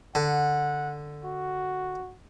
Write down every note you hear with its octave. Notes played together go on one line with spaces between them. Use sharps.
D3 F#5
F#4